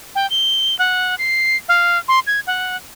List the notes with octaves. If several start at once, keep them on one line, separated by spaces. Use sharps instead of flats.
G5
G7
F#5
C7
F5
C6
G#6
F#5